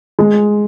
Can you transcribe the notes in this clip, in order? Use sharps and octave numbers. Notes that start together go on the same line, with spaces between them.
G#3